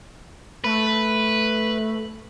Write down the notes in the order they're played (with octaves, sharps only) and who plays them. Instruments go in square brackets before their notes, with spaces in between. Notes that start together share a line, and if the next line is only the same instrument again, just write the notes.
[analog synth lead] A3 [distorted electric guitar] B4